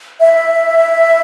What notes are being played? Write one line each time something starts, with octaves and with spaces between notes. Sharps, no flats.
E5